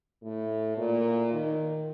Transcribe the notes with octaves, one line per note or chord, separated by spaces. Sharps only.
A2
A#2
D#3